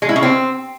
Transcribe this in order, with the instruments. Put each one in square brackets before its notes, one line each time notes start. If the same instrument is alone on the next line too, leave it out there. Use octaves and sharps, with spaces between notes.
[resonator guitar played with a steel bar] G#3
E4
C#3
C4